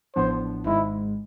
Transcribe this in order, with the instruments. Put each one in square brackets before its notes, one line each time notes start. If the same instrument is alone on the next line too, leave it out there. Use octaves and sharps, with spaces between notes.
[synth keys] A1 A2 F3 B3 D4 [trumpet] C5
[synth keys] G#1 G#2 G#3 [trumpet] E4